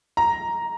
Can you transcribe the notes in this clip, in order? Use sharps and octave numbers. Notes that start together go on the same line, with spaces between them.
A#5